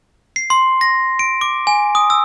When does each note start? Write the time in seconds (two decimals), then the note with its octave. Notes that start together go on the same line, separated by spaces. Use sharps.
0.36 C7
0.50 C6
0.81 A#6
1.19 D7
1.41 D6
1.67 G#5
1.95 D#6
2.10 E6